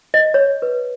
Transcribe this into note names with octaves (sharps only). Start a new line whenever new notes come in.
D#5
C#5
B4